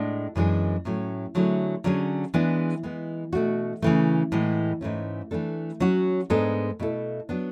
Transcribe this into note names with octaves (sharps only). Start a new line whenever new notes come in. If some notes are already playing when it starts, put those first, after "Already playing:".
Already playing: A2 G#3 D4
F#2 E3 G#3 D4 G#4
A2 F#3 A3 C#4
D3 F#3 A3 E4 G#4
D3 F#3 C#4 G#4
E3 G#3 B3 D4
E3 G#3 B3
B2 A3 D4 F#4
C#3 E3 A3
A2 E3 G#3
G#2 E3 A3 C#4
E3 A3 D4 A4
F#3 C#4 F#4
G#2 G#3 B3 D4 A4
B2 A3 E4 A4
F#3 B3 D4